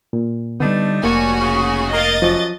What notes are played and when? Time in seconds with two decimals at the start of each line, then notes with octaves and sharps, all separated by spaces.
0.13 A#2
0.60 D3 G3 A3 B3 D4 D#4
1.04 F1 G3 A#3 D4 F#4 C#5 G#5
1.41 C#3
1.93 A#3 D#5 A#5 A6
2.22 F#2 F3